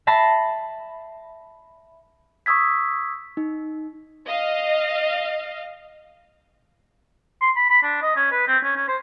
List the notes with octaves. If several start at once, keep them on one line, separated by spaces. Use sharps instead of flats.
E5 A5 B5 A#6 C7
C#6 D#6 E6 G#6 B6
D#4
D#5 F5
C6
B5
B5
D4
D#5
C#4
B4
C4
C#4
C#4
C5